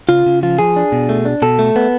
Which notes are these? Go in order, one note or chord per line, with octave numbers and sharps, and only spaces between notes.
C#3 F4
C#3
F3 F4
F3 G#4
D4
B2
A3
D4
B2 A4
A3
B3